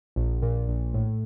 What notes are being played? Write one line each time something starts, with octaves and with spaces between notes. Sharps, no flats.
A#1
A#2
A#1
A2